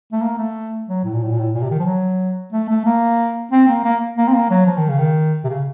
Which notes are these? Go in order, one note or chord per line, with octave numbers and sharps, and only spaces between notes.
A3
A#3
A3
F#3
A2
A#2
A2
A#2
A2
A#2
C3
D#3
F3
F#3
A3
A3
A#3
C4
A#3
A#3
A#3
C4
A#3
F#3
F3
D#3
C#3
D#3
C3
C#3